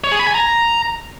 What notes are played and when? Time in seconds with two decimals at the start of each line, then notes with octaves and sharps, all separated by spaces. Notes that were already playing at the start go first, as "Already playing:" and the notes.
0.04 C#5
0.12 G#4
0.19 B5
0.27 G#5
0.35 A#5